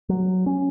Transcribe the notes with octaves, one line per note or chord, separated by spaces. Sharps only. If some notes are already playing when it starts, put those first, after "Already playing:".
F#3
C#4